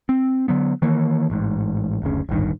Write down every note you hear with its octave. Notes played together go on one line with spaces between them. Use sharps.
C4
D3 F#3 B3
D#3 E3 A#3
A1 G#2
F#1 D2 C#3
D1 G#1 G2 D#3